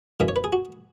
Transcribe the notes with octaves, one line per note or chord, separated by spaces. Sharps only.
F#2 C#3 E3 E5
C#5
B4
G#4
F#4